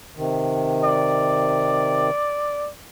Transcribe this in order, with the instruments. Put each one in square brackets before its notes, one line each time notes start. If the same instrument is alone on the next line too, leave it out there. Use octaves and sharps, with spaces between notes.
[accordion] C3 D#3
[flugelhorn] D5